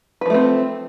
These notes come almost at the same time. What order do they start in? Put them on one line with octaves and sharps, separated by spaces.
B4 F3 A3 C4